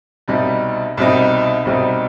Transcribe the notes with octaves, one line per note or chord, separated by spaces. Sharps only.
C2 B2 G3 C4 D#4
C2 B2 G3 C4 D#4
C2 B2 G3 C4 D#4